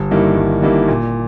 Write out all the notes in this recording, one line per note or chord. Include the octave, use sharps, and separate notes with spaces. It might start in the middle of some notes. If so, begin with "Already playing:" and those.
Already playing: G1
G2 D#3 A#3 E4
G1
G2 D#3 A#3 E4
A#2